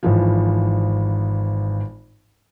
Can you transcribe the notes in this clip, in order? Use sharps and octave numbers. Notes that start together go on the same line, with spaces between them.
G#1 E3 F3